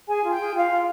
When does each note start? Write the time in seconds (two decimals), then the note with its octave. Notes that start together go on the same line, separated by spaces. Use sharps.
0.08 G#4 G#5
0.24 F4
0.31 G5
0.40 G#4
0.55 F4 F5
0.71 F4